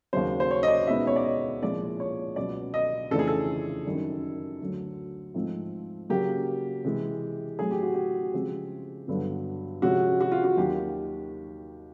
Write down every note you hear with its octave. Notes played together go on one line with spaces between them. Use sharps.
D#2 C#3 F#3 C5
C5
C#5
D#5
D5
C#2 B2 G#3 B3 D#4 E5
C#5
D5
D#5
C2 A#2 F3 G#3 D5
C#5
C#2 B2 F#3 B3 D5
D#5
F2 C#3 E3 A3 D4 A4
G#4
A4
F#2 D#3 G3
D2 D3 F#3
G#2 F3 A3 C4
C#3 F#3 A#3 G4
C3 E3 G#3
A2 F#3 A3 G#4
G4
F#4
G4
C#3 F3 G#3 C4
G2 D3 F#3 B3
C3 F3 G#3 C#4 F#4
F#4
F4
F#4
D#2 D#3 F#3 G4